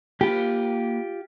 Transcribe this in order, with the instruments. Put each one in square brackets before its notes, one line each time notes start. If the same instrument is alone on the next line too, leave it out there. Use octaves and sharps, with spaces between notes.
[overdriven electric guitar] A#3 B5 [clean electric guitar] F4 G4